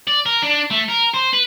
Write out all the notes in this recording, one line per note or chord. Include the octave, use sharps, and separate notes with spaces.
D5
A#4
D4
A3
A#4
C5
B4